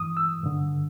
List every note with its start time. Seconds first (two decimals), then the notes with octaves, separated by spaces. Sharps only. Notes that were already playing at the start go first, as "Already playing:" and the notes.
Already playing: G2 E3 D#6
0.17 E6
0.44 G2 D3